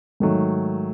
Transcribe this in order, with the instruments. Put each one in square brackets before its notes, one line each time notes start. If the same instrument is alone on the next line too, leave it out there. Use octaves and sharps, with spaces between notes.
[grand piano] G#2 D#3 F#3 A3